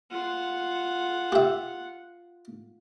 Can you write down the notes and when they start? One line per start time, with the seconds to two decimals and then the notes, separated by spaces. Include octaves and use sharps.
0.11 F4 F#5
1.32 G4 E5